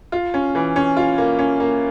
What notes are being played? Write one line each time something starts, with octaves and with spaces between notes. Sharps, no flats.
F4
C#4
E3
C#4
F4
A#3
C#4
A#3